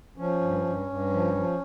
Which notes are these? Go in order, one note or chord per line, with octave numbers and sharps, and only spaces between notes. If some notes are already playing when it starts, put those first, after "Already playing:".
F3 C#4
G2
G2
G2
F3
F3